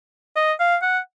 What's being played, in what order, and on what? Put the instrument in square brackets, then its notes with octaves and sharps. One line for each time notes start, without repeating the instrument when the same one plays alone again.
[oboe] D#5
F5
F#5